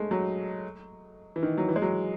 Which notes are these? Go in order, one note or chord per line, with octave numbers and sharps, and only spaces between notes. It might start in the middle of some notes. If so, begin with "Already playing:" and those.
Already playing: G#3 A3
F#3
E3
D#3
F#3
E3
G#3
F#3